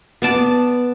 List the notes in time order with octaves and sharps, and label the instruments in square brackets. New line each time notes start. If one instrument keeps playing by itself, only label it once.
[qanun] B3 D5 A5